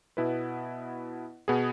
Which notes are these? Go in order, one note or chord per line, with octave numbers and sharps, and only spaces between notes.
B2 B3 E4 B4
B2 B3 G#4